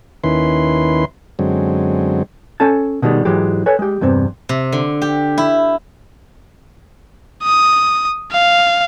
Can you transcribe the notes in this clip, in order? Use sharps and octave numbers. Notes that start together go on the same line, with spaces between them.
D#2 D#3 C#4 E4 B4 C6
F#2 D3 F#3 G#3 C4
C#4 A4 G#5 A5
B2 D3 D#3 G3 G#3
G#2 E3 F#3 G#3 G4
A4 B4 C#5 G#5
G#3 G4
E2 G2 C3 C4
C3
D3
G4
E4
D#6
F5